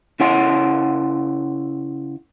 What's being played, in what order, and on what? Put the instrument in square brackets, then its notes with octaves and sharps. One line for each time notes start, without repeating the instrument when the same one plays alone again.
[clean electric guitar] C#3 E4 C#5 F#5 C6